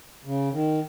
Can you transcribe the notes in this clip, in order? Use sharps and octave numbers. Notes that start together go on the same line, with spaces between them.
C#3
D#3